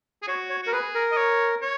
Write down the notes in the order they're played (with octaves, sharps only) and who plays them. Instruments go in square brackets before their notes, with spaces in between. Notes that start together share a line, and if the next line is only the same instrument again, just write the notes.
[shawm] G#4
[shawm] F#4 [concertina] C#5
[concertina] C#5
[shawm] F#4 [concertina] A#4
[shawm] G#4 [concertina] B4
[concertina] A#4
[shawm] D#5
C#5
C#5